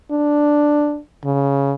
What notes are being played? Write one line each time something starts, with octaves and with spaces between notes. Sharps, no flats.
D4
C#3